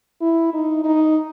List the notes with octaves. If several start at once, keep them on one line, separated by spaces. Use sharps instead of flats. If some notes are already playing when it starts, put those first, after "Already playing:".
E4
D#4
D#4